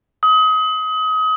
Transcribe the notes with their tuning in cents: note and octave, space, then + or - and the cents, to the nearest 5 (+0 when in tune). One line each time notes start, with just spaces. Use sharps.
D#6 +30